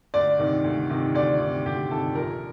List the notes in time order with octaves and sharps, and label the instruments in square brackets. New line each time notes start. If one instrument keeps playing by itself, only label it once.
[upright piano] D2 D5
C3 D#3
D2
C3 D#3
D2 D5
C3 D#3
D2 G4
C3 D#3 A4
A#1 A#4